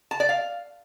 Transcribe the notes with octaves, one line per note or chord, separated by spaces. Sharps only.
A5
D5
F5